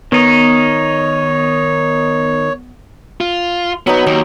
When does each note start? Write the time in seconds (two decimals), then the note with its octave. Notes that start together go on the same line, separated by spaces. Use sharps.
0.12 D#3 B3 D#4 C#5
3.21 F4
3.87 F#3 B3 D#4
4.07 D#2 A#5